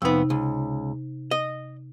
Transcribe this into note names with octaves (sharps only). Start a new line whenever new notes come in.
F2 C3 B3 D#4
C#2
D#5